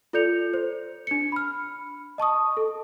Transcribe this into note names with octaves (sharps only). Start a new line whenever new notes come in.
F4 A4 D5 G6 C#7 F7
C5
D4 C#7
B5 F6
D#5 A5 C#6 D#6
A4